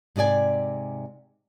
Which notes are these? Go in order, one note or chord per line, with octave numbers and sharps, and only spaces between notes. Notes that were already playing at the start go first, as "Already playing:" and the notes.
G#2 C3 G#4 D5 G#5